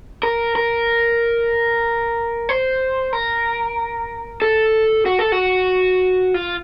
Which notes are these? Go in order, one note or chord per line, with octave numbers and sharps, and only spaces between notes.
A#4
A#4
C5
A#4
A4
F#4
A4
F#4
F4